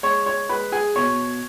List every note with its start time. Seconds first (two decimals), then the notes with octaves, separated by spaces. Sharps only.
0.03 G#3 C#5 C#6
0.26 C#5 C#6
0.49 G#3 B4 B5
0.72 G#4 G#5
0.96 B2 C#5 C#6